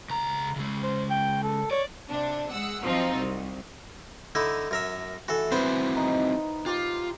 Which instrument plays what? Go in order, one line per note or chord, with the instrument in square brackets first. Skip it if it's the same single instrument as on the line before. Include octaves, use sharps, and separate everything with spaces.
[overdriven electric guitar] C#2 A#5
C#3 G#3
[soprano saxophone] C5
G5
A4
[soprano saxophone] C#5 [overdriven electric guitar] D5
[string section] C3 D4
G#3 F#5 E6
F3 F#3 C4 D#4 F4
C2
[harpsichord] D3 D#4 E4
F#2 A#4 E5
[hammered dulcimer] E3 [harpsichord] F#4 A4
[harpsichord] B3 C5 [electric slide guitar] C4 E4 F#4
[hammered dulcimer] D#4
[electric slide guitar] F4 [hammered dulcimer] G4